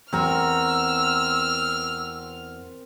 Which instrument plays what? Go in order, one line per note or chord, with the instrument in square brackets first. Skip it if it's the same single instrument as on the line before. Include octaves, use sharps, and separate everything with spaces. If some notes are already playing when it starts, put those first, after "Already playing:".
[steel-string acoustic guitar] E2 F#4 [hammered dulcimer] C4 A#4 [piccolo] E6 [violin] F6